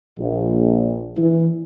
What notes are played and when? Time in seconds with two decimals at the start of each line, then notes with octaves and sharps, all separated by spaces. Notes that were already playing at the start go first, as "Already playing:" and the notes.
0.19 A#1
1.18 E3